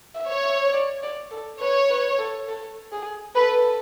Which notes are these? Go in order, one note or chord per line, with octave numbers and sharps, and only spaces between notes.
E5
C#5
E5
D5
D5
A4
B4 C#5
B4
A4
A4
G#4
A4 B4